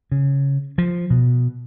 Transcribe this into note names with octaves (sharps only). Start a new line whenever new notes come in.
C#3
F3
B2